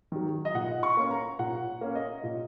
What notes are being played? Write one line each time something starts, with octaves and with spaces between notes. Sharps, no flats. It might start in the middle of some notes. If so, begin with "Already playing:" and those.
D#3 F#3
D#5
A#2 F#5
C#6
A#3 C#4
A#5
A#2 F#5
A#3 C#4
D#5
A#2